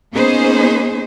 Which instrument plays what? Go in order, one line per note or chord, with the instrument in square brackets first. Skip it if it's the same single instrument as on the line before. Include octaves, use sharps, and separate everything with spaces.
[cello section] A#3 B3 C#4 D#4 G#4 C5